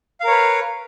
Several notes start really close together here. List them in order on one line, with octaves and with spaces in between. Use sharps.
F5 A#4 C#5 B4